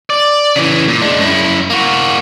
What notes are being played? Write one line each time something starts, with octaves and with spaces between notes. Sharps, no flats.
D5
C#3 E3
A#2
G#3 D4
F#2 E4
A#3 F#4